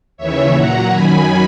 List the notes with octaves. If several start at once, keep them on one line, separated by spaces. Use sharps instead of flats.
D#2 C#3 E3 C#5 E5
A#2 F#3 F#5 A#5
F#2 D#3 F#3 G#5 B5